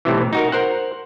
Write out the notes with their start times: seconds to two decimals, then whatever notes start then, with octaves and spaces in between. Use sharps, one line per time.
0.05 B1 A2 C3 E3
0.33 D#4 F#4 A#4
0.52 A#4 C5 F#5